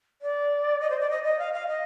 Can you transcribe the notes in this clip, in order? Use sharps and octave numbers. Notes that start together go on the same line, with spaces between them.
D5
D#5
C5
D5
D#5
D#5
F5
F5
D#5